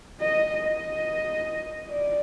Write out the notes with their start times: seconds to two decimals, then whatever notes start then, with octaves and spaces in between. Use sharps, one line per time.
0.21 D#5
0.55 D#5
1.89 D5